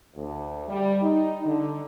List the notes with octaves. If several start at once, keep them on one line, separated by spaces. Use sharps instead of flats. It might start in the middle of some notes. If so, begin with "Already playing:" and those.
D2
G3
D#4
D3